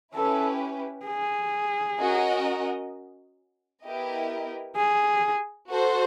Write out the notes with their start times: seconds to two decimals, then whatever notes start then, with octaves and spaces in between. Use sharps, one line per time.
0.14 C#4 E4 G4 A4 B4
1.06 G#4
1.99 C#4 F#4 A#4 D#5
3.84 B3 E4 G4 A#4 D#5
4.76 G#4
5.68 F#4 A4 C5